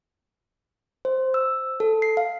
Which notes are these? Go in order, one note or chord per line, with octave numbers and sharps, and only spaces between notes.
C5
E6
A4
C7
F5